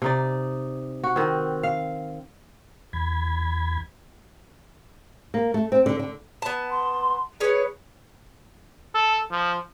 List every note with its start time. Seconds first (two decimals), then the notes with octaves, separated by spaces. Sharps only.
0.02 C3 D#4 D5
1.04 F#4
1.16 D#3 C4
1.63 F5
2.93 E2 B5 G#6
5.34 A#3
5.54 A3
5.72 C4
5.86 D3
5.99 D3
6.42 B3 A5
6.71 C6
7.40 C#4 G#4 B4 C#5
8.95 A4
9.31 F3